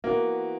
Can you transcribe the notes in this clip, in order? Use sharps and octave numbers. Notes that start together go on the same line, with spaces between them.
E3 A#3 B3 F#4